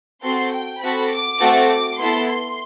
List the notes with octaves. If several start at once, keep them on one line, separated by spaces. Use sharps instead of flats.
C4 F#4 A4 C6
G5
C4 F#4 A4 B5
D6
A3 C4 F#4 A4
D6
B3 E4 A4 C6
C6